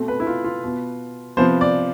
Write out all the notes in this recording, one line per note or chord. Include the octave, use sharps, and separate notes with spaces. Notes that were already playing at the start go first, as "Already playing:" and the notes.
Already playing: B2 A3 C4
B4
E4
F4
F4
B2 B3
C3 F3 B3 C5
D5